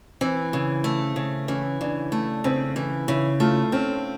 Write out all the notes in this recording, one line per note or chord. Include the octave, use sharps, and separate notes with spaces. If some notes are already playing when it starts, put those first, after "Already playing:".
E3 C4
C#3
A3
C#3
E3 C#4
C#3 D4
A3
C#3 C4
E3
C#3 E4
A3 F4
C4 C#4